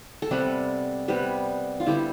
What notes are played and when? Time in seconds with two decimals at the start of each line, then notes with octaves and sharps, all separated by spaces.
0.22 A4
0.31 C3 G3 B3 G4 B4
1.08 C3 G3 B3 G4 B4
1.80 F4
1.86 D3 G3 B3 E4 G4